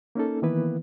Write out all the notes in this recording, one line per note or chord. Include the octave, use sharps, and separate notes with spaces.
A#3 C#4 D#4 A4
D#3 E3 A#3 B3 E4 B4